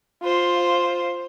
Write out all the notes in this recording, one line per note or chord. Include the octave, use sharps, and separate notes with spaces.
F4 C5